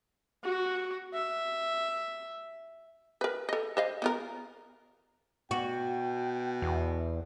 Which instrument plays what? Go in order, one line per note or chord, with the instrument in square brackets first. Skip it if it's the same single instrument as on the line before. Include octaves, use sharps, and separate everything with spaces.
[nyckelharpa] F#4
E5
[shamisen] A#4 B4
A4 D#5
C5 D#5 F5
B3 F4 A#4
[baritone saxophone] B2 [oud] F#4 [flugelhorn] G5
[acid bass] E2